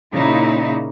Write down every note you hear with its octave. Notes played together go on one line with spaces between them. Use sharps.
A#2 C#3 D#4 E4